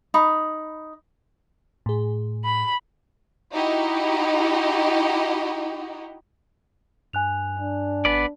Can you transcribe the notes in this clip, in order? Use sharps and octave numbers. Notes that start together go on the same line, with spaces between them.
D#4 B5
A2 G#4
B5
D#4 E4 F#4 G4 D#5
G2 G#5 F#6 F7
D4
G#1 B3 B4 D5